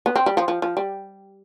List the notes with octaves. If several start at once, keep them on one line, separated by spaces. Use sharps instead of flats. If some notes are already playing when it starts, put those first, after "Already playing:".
B3
C4
G3
F3
F3
F3
G3